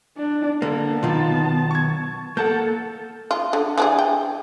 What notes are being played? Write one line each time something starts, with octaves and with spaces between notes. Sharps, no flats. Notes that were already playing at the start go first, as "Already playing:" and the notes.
D4
D3 A#3 B3 A5
B1 D#3 F4
C#6 G#6
A#3 A4 F#5 A5 G6
F4
D3
E3 D4 G#4
G5